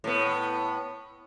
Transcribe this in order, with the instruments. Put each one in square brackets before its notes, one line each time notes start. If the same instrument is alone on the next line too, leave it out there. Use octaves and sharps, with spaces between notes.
[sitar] A2 B3